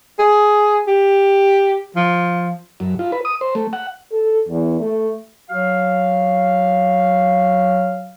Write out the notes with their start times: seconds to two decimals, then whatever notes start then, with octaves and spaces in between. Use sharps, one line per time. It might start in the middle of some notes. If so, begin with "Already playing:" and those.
0.19 G#4
0.88 G4
1.96 F3
2.80 F#2
2.99 F4
3.12 B4
3.25 D#6
3.41 C5
3.55 A3
3.73 F#5
4.12 A4
4.48 E2
4.81 A3
5.50 F#3 F#4 F5